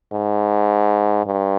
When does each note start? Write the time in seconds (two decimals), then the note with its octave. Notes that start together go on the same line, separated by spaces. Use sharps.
0.13 G#2
1.26 G2